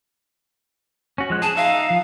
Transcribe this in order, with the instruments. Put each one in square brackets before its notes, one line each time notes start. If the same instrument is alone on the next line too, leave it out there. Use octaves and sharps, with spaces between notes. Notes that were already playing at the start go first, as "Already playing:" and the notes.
[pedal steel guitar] C#4 F#4
F3 G#3 F#6
[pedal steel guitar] G#4 [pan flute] A5
[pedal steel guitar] D#4 E5 [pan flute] F5
[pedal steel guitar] F3